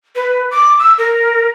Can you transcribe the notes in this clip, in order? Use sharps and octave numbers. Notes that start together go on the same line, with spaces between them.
B4
D6
E6
A#4